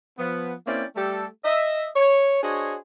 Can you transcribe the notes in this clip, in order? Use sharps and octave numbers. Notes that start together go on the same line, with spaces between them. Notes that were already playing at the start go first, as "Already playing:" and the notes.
F3 B3
A#3 C4 C#4 E4 D5 G5
G3 A3 G4 A4
D#5 E5
C#5
D4 F#4 G#4 C5 C#5 D#5